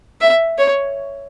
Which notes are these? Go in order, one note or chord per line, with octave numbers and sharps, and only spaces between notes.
E5
C#5